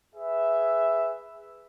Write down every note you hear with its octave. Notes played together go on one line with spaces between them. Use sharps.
G#4 B4 E5